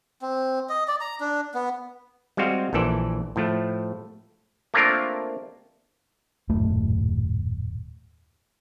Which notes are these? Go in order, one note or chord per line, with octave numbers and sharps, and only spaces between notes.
C4
D#5
D5
A#5
D4
B3
G3 G#3 C4 F#4 C5 F5
A#1 A#2 E3 A4 D5
A2 F3 A3
A3 A#3 C4 D4 F4 A#4
D#1 F#2 A2 A3